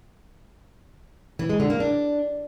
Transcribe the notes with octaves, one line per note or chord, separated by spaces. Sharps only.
E3
G#3
D3
A#3
D4